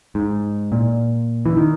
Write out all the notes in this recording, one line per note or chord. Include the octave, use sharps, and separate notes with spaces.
G#2
A#2
E3
D#3